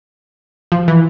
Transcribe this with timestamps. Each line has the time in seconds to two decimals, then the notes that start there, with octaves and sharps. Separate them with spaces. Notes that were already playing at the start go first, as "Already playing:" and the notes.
0.72 F3
0.88 E3